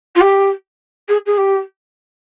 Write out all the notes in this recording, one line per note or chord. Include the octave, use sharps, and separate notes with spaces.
F4
G4
G#4
G#4
G4